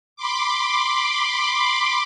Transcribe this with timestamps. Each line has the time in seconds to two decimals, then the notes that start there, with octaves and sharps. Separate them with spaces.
0.16 B5 C6 D6